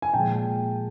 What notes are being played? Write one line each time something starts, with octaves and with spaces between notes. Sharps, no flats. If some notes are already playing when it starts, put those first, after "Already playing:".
G#5
A#2 F3 G#3 G5 A5